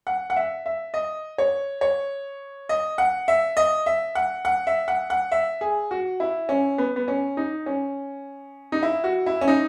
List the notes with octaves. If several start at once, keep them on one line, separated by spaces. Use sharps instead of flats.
F#5
F#5
E5
E5
D#5
C#5
C#5
D#5
F#5
E5
D#5
E5
F#5
F#5
E5
F#5
F#5
E5
G#4
F#4
E4
C#4
B3
B3
C#4
D#4
C#4
D#4
E4
F#4
E4
C#4
D#4